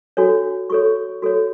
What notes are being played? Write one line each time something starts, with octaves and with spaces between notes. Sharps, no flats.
D4 F#4 A4 C#5
F#4 A4 C#5 C#6
F#4 A4 C#5